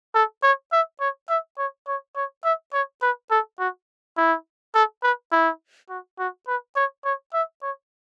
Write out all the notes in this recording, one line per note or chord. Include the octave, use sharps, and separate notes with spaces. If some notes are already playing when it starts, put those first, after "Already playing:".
A4
C#5
E5
C#5
E5
C#5
C#5
C#5
E5
C#5
B4
A4
F#4
E4
A4
B4
E4
F#4
F#4
B4
C#5
C#5
E5
C#5